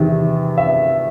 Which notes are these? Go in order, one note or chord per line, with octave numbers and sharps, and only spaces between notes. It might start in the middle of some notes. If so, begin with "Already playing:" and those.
Already playing: E2 C3 D#3
E5